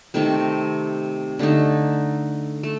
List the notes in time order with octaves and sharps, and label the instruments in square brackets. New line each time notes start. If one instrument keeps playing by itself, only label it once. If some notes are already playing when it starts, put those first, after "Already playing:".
[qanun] C3 D#3 A3 C4
D3 A3 D#4
A3